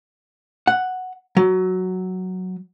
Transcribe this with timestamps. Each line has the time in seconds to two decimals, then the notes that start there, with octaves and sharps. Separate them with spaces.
0.67 F#5
1.37 F#3